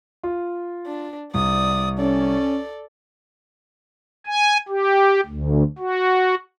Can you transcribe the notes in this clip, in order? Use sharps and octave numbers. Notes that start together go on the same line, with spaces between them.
F4
D4
C2 D5 D#6
C#4 A4 D5
G#5
G4
D2
F#4